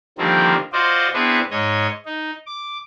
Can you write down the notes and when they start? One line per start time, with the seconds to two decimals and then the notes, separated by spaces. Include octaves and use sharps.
0.18 D3 D#3 F3 G3 A#3 C4
0.73 F4 F#4 C5 D5 D#5
1.13 B3 C4 D4 E4 G#4 B4
1.51 G#2 C#5 D#5
2.05 D#4
2.46 D6